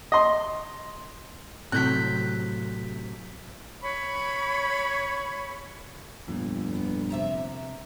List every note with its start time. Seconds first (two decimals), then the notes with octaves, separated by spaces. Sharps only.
0.12 D#5 C6
1.72 A2 C3 F#3 C4 F#6 G6 B6
3.81 C#5 B5 C#6
6.28 G1 F2 A#2
6.75 B3
7.10 C3 E5 A#5